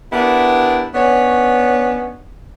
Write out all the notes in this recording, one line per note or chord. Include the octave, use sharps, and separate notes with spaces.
B3 D4 E4 G4 A#4
B3 C#4 D4 C#5